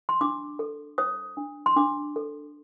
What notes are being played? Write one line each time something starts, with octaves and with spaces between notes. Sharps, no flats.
C6
D4 D6
A4
C5 D#6
D4
C6
D4 D6
A4